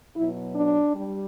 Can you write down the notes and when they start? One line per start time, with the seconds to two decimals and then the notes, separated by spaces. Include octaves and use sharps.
0.16 B2 F#3 E4
0.55 D4
0.95 G3